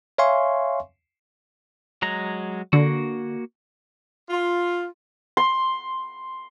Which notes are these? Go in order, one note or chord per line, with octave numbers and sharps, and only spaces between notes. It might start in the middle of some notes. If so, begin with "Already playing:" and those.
C#5 E5 F5 G#5 C6 C#6
F#3 G#3 A#5
D3 A#3 F#4
F4
C6